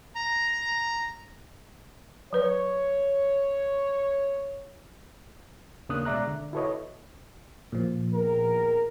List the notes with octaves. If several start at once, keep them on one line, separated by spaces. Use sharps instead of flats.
A#5
F#3 B4 C#5 D5
D#2 C#3 A#3 D4 D#6 F#6
B2 G#3 D5 E5 A#5 F#6
D3
E4 F#4 A4 B4 C#5 D#5
A#2 F3
E2 D#3 A#4